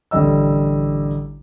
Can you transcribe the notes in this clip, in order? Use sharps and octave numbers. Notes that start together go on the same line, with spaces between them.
A1 D3 G3 D#5 E6